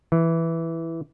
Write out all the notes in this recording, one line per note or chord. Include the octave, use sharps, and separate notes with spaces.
E3